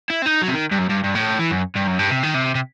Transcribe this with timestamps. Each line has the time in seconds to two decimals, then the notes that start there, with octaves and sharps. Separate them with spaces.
0.10 E4
0.22 C4
0.26 D#4
0.42 F#3
0.48 C3
0.54 D#3
0.72 G2
0.79 F#2
0.90 G2
1.04 G2
1.15 A2
1.39 E3
1.50 F#2
1.75 G2
1.87 F#2
1.99 G2
2.10 C3
2.23 D#3
2.35 C3
2.55 C3